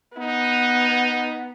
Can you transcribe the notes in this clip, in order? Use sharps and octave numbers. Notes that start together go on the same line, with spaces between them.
B3 D#4